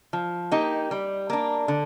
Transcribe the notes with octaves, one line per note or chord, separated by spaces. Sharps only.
F3
A#3 D#4 G4
G3
A#3 D4
D3